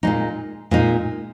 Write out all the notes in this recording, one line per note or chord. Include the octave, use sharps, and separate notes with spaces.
A#2 G#3 D#4
A#2 G#3 D#4